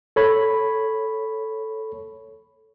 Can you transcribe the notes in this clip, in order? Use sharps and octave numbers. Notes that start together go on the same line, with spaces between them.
A4 C#5 B5